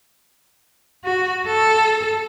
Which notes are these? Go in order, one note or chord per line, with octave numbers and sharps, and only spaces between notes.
F#4
A4